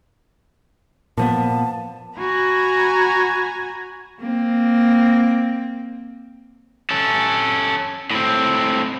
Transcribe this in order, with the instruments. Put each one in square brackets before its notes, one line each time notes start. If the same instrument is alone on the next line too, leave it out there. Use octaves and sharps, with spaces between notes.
[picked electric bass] A#2 F3 B3 [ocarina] A5
[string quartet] F#4 G#5 A#5 B5
[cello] A#3 C4
[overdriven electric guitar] C#4 A4
A2 C4